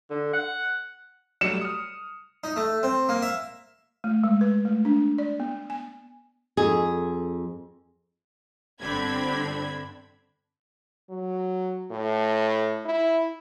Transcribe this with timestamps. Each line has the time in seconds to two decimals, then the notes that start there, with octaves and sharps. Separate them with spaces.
0.10 D3
0.33 F#5
1.41 F#3 G3 A3 C#7 E7
1.61 D#6 F6
2.44 D#4
2.56 A3
2.83 C4
3.09 A#3
3.22 E5
4.04 A3
4.24 G#3
4.41 B4
4.65 A3
4.85 D4
5.18 D5
5.40 B3
5.70 G#5
6.57 F2 G#4
8.81 G1 D3 C4 D4 B5 G#6
11.10 F#3
11.91 A2
12.85 E4